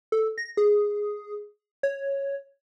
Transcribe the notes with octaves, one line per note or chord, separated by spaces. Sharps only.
A4
A#6
G#4
C#5